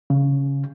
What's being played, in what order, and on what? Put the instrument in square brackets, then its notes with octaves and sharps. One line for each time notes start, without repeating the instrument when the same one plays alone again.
[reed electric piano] C#3